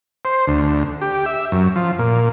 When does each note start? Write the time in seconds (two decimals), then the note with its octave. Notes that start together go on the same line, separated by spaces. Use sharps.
0.25 C5
0.47 D2
1.01 G4
1.26 E5
1.52 F#2
1.76 F3
1.99 A#2